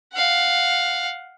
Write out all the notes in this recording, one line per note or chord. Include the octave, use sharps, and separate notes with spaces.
F5 F#5